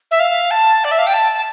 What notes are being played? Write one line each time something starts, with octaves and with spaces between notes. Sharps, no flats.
E5
F5
A5
D5
E5
F5
G5
A5